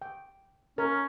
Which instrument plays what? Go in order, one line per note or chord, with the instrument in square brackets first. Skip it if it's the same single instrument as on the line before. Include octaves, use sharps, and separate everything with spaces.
[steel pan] G5
[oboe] C#4 [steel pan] A#4